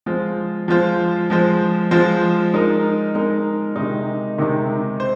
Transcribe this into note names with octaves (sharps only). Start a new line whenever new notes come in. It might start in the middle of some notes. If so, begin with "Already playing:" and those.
F3 G#3 F4 C5
F3 G#3 F4 C5
F3 G#3 F4 C5
F3 G#3 F4 C5
G#3 D#4 A#4
G#3 D#4 A#4
C3 D#3 G#3 D#4
C3 D#3 G#3 D#4
C5